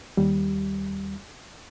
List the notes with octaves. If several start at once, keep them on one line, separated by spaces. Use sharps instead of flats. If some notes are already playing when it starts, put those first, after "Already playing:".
D#2 G3